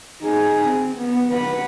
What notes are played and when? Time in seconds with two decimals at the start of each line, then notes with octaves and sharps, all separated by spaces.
0.22 D#4 G#4
0.68 C4
0.97 B3
1.30 B4 F#5